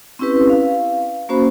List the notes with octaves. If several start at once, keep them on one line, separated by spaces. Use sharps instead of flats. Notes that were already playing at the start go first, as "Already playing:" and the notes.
C4 C#4 E4 G4 B4
F5
A#3 C#4 F#4 C5 B5